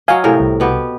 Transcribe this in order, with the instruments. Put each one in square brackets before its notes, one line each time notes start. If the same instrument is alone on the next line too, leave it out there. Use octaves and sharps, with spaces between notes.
[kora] F#3 D#5 [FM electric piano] F5 G#5
[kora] A2 C3 A#4
[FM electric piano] C2
[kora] B2 B3 G4